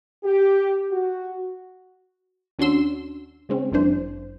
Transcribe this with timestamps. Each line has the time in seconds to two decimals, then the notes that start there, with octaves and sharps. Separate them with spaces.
0.24 G4
0.92 F#4
2.59 D#2 C#4 D4 F#4 C6 E6
3.49 C#3 G#3 C4 C#4
3.72 G1 F#2 E3 D4 C5